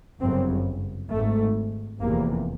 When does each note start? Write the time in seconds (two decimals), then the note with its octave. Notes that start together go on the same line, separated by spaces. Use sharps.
0.21 G1 F#2 C#3 C4
1.11 G#1 G#2 A3
2.00 F1 E2 C3 A#3